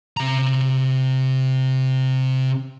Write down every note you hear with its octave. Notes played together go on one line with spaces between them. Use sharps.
C3 A#5